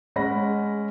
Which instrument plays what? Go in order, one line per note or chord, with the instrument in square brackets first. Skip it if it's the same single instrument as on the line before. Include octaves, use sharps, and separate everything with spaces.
[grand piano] G#3 C#4 F#5 B5 A#6